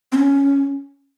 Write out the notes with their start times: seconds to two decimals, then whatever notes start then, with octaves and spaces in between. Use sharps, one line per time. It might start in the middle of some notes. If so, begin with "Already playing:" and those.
0.12 C4
0.18 C#4